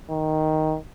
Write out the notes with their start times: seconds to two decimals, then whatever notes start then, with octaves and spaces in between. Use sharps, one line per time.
0.10 D#3